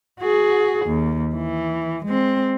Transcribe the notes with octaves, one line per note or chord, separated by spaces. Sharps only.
F#4 G#4
D#2
E3
G#3 C4